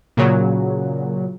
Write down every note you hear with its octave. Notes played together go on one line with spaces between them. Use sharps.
A#2 C#3 F#3